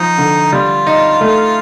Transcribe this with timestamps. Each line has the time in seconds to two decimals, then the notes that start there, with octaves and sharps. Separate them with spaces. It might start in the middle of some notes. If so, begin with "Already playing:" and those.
Already playing: F3 D#4
0.18 D3
0.53 G3 F4
0.87 D#4
1.21 A3